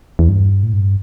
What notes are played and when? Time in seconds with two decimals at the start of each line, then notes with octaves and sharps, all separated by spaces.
0.19 E2
0.29 G2
0.63 A2
0.73 G2